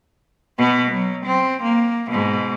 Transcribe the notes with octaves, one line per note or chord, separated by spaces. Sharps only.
B2 B3
F#3
C4
A#3
G#2 B2